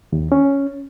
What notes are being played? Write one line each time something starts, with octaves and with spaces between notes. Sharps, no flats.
D#2
C#4